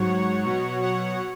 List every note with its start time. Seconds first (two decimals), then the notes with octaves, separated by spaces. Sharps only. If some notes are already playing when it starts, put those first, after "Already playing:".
Already playing: G#2 F#3 C#5 F#5
0.45 B2 F#3
0.82 C#5 F#5